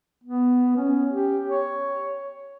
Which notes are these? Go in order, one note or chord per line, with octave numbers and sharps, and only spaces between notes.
B3
C#4
G4
C#5